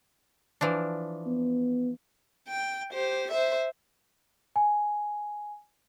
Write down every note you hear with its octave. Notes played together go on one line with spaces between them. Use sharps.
E3 F3 D4
B3
G5
G4 C5
C5 E5
G#5